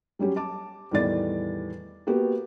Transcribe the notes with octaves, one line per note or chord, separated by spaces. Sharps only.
F#3 G3 C#4 G4
A5 D6
E2 A2 D#3 G3 D5 A6
A#3 B3 F#4 G4 B4